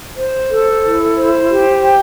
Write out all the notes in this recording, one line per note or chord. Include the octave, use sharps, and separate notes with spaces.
C5
A4
E4
C5
G4
G5